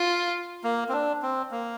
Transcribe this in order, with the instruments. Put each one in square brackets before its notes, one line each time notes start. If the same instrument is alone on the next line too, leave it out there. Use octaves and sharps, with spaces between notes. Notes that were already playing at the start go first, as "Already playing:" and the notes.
Already playing: [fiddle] F4
[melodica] A#3
C4
D4
C4
A#3